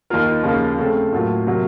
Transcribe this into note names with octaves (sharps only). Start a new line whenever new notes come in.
D#2 D#3 A#3 F4 A#4
D#2 C#3 F3 A#3
C#3 A3 C4
A2 F#3 A#3 F4
C3 F#3 A#3